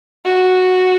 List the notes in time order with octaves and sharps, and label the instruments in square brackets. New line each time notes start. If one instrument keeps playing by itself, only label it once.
[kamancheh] F#4